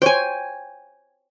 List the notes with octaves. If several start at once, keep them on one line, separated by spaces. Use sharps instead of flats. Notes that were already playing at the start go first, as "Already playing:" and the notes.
C5 C#5 G5 G#5